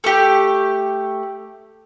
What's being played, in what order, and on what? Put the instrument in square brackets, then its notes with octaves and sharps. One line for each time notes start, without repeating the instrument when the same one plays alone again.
[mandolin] A3 G4